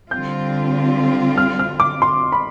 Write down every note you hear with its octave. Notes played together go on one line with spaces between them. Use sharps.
D3 G3 C4 F4 G6
F6
F6
D6
C6
B5